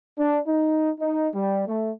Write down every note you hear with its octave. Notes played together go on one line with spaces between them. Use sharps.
D4
D#4
D#4
G3
A3